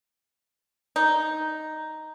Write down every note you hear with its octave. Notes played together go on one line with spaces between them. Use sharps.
D#4